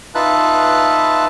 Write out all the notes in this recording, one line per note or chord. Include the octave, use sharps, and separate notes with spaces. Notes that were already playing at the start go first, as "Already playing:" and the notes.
D#4 F4 B4 E5 A5 F#6